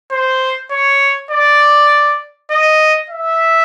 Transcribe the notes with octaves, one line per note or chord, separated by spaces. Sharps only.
C5
C#5
D5
D#5
E5